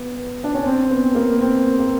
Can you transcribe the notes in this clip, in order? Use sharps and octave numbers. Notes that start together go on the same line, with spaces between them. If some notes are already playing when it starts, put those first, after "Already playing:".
Already playing: B3
D4
C#4
C4
B3
A#3
C4
A#3